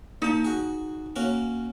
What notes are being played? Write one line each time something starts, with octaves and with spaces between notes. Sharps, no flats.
A#2 D#4 A5
F#4 G#4
A#3 C#4 F#4